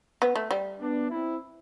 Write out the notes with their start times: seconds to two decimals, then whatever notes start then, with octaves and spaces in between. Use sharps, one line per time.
0.22 B3
0.36 A3
0.51 G3
0.80 B3 D4
1.10 C4 E4